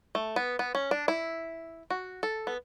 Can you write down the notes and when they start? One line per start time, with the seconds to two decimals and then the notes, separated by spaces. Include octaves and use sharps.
0.15 A3
0.36 B3
0.59 B3
0.75 C#4
0.91 D4
1.08 E4
1.90 F#4
2.23 A4
2.47 B3